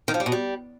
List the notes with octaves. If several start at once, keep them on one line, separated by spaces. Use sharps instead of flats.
D#3
F3
G3
B2
G3